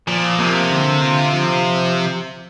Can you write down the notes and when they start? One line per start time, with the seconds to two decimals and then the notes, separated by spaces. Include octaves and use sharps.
0.08 A#2 F3
0.39 C3 A#3
0.70 D3
1.02 F4
1.33 F3